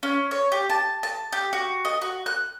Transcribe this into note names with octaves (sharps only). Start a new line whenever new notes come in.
C#4
C#5
G4
A5
A5
G4
F#4
D#5
F#4
F#6